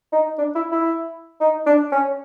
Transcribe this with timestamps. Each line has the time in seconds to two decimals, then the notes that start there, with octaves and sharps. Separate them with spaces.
0.13 D#4
0.38 D4
0.55 E4
0.72 E4
1.40 D#4
1.66 D4
1.92 C#4